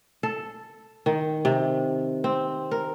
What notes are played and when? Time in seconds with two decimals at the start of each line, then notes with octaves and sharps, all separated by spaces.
0.23 A4
1.06 D#3
1.45 C3
2.24 C4
2.71 A#4